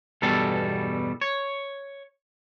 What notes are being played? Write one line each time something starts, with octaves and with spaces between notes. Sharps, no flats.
E2 G2 B2 G3 A4
C#5